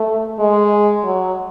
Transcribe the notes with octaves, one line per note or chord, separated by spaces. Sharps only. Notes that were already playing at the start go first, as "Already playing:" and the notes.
Already playing: A3
G#3
F#3